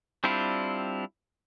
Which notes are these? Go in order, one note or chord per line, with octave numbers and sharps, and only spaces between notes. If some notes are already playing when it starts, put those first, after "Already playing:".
G3 C4 D4 E4 F4